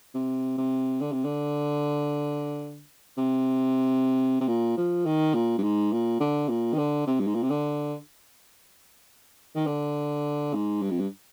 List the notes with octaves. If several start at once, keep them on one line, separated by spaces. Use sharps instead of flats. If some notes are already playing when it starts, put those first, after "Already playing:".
C3
C3
D3
C3
D3
C3
C3
A#2
F3
D#3
A#2
G2
G#2
A#2
D3
A#2
D#3
D3
C3
G2
G#2
A#2
C3
D3
D#3
D3
G#2
G2
F2
G2